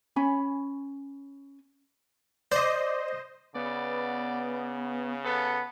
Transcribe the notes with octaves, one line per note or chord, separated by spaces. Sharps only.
C#4 C#5 G#5 B5
C5 D5 D#5
C#3 B3 D5
B3 A4